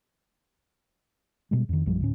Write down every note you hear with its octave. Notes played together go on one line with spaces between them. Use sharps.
B2 G3 G#3
F2 D#3
A#1 F#2 F3 G3
D2 A2 C#4